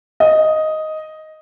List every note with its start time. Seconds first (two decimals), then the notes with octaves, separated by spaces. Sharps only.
0.20 D#5